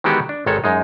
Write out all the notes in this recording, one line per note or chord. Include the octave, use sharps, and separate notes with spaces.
D#3 E3 G#3 B3 F#4 G4
D4
G#1 D#3 G#3 A4 C#5
F#2 G#3 D#4